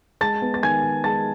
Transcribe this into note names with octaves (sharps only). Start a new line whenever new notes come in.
G#3 A5 A6
B3
A6
D#3 G#5 G#6
D#3
G#3 A5 A6